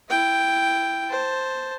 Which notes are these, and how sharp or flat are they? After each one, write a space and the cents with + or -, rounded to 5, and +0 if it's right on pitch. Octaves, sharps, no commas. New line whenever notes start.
E4 +10 G5 +0
C5 +0 A5 +0